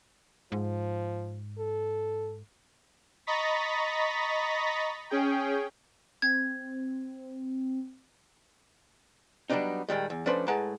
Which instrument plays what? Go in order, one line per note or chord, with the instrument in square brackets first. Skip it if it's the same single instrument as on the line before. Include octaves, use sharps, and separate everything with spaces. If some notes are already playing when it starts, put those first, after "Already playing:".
[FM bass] G#2 [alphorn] F3
[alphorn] A4
[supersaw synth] D#5 A#5 B5 C#6 A6 B6
C#4 G#4 G5
[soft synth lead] C4 [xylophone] G#6
[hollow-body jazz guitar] F#3 G3 B3 C4 D4 D#4
A#2 D#3 G3 G#3
E2
F3 A3 C#4 D4 B4 C5
A2 G#3 B4 F#5 A5 A#5